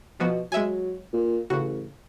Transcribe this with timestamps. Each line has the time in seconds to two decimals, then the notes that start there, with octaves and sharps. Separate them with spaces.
0.20 B2 F3 B3 F#4
0.52 F#3 G#3 E5 G#5
1.13 A#2
1.50 A1 C#3 F#4